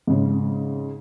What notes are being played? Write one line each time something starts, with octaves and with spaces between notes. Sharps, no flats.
G#2 C#3